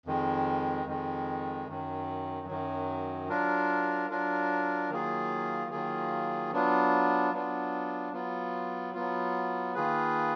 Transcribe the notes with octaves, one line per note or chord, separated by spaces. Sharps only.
F2 D#3 G#3
F2 D#3 G#3
F#2 D#3 F#3
F#2 D#3 F#3
F#3 D4 F4 A#4
F#3 D4 F4 A#4
D#3 F#3 A#3 F4 G#4
D#3 F#3 A#3 F4 G#4
F#3 B3 D4 F4
F#3 B3 D4 F4
F#3 B3 F4
F#3 B3 F4
D#3 A#3 F4 G#4 B4